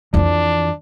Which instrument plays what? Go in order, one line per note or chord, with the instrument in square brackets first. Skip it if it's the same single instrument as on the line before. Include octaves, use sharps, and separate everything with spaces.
[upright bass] F2 E3 [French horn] D4